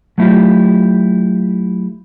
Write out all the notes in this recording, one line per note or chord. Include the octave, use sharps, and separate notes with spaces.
F#3 A3 E4 F4 G4